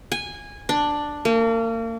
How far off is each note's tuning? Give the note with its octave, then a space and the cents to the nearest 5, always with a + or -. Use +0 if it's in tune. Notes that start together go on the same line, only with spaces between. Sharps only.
G#5 -15
D4 +5
A#3 -35